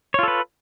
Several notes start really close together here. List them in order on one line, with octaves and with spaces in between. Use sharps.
C#5 F4 A4 B4